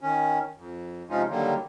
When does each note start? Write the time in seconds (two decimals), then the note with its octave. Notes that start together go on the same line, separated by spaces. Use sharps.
0.01 D#3 C#4
0.57 F2
1.10 C3 F3 G#3 C#4 D#4 F4
1.30 D3 D#3 F#3 G3 A#3